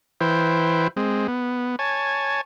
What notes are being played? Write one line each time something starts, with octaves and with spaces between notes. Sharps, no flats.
E3 E4 B4 C5 G5
G#3 C4
B3
C#5 G#5 A5